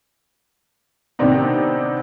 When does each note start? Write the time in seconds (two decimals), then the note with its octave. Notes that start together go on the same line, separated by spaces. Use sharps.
1.19 C3 D#3 B3 C4 D4 D#4